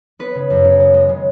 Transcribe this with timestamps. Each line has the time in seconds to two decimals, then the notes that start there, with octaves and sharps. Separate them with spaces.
0.19 B3 B4
0.35 C#3
0.50 F#2
0.64 C#3
0.80 B3
0.94 G#3
1.09 C#3